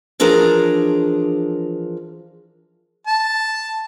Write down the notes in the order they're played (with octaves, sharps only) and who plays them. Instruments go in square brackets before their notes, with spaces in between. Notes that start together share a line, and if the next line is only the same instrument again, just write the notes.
[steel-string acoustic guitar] E3 F3 D4 G#4 A#4
[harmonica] A5